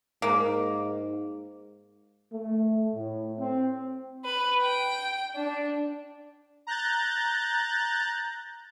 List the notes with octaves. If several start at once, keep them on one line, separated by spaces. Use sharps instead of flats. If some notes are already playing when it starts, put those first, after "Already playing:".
G#2 A#3
A3
A2
C4
B4
G5
D4
A#5 F#6 G6 A6